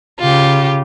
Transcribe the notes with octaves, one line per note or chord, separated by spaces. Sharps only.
C#3 F4 G4